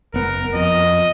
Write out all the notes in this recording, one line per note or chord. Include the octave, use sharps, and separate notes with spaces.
F#1 B3 A#4
F2 D#5